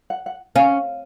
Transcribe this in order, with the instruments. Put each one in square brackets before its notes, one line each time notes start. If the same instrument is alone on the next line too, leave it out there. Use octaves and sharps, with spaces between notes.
[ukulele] F#5
F#5
[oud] C#4 [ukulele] F5